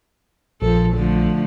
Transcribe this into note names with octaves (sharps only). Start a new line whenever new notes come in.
A#1 F3 A4
D3 F3 A3